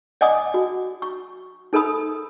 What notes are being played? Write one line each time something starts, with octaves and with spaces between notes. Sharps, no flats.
D5 D#5 F#5 G#5 D6 D#6
F#4
C#6
D#4 A4 A#4 B5 D#6